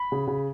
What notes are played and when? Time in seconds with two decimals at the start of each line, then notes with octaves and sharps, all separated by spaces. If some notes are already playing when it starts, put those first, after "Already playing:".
Already playing: B5
0.12 C#3
0.28 C#3